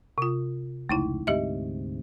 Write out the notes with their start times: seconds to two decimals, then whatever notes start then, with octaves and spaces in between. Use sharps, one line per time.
0.18 C3 F4
0.89 F1 C#2 A3 D#4 E4
1.27 D2 G#2 C3 G4 D#5 E5